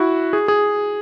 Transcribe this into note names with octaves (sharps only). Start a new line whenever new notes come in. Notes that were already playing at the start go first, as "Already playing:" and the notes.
Already playing: E4 F#4
G#4
G#4